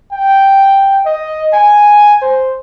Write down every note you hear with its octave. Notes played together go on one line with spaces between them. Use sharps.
G5
D#5
G#5
C5